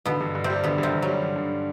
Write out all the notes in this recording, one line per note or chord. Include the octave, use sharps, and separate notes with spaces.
B2 D3 B3
G2
G2
C3 C4
G3
B2 D3 B3
G2 C3 C4
G2
F#3 G3
D3
G2